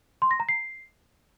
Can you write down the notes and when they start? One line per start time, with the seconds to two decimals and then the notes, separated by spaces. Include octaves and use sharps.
0.22 C6
0.31 A#6
0.40 A#5
0.49 C7